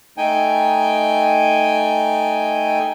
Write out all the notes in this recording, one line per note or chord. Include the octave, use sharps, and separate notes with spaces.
A3 D#4 G5 G#5